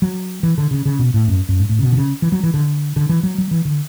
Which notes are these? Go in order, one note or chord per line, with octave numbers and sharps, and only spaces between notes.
F#3
E3
D3
C#3
C#3
B2
A2
F#2
F#2
G#2
A2
C#3
B2
D3
C#3
E3
F#3
E3
D3
D3
E3
F#3
F#3
E3
D3